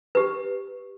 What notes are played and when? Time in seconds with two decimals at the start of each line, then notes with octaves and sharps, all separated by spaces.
0.15 G4 B4